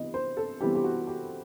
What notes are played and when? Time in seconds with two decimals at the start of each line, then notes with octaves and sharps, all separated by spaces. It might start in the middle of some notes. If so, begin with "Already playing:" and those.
Already playing: C3 E3 G3 B3 D#5
0.14 C5
0.37 A4
0.61 C3 E3 G3 B3 G4
0.75 G4
0.84 F#4
1.07 G4